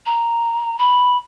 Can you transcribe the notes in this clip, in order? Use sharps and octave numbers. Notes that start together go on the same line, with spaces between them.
A#5
B5